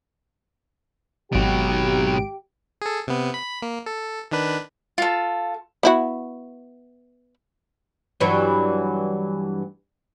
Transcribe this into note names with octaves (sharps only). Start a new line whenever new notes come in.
G#1 B2 F#3 G4 D7
G#4 A4
C3 B3
B5
A#3
A4
D#3 D4 B4
F4 A4
B3 E4 F#4
G2 E3 F#3